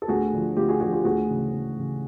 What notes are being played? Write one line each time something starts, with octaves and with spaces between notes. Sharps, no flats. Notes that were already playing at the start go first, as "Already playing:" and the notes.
A4
D2 F#4 G#4
D3 F3
D2 F4 G4
F#4 G#4
D3 F3 F#4 G#4
F4 G4
D2 F#4 G#4
C#3 E3
D2
C#3 E3